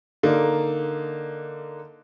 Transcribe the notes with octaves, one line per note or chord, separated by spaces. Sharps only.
D3 A#3 D#4